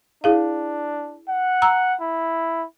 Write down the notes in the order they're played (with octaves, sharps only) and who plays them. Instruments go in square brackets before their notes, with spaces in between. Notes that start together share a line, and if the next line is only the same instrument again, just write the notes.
[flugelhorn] D4 [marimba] E4 G#4 F5
[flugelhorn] F#5
[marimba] A#5 E6
[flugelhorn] E4